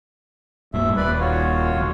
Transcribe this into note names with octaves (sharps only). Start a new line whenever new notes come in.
D1 G2 A#2 E5
D#1 B4 D5 B5
F4 F#4 C#5
E1 B1 E2